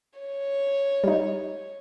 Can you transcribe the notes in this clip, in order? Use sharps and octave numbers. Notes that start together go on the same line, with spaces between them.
C#5
G3 D#4